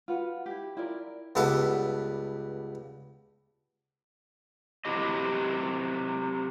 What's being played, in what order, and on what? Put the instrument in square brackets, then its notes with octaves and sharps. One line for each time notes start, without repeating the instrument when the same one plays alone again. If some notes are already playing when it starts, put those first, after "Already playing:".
[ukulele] F4 F#4 B4 F#5
E4 G4
E4 F4 A#4 D5
[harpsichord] C#2 G2 B3 A4 F#5 D6
[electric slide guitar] C3 F#3 E4 G4 D#5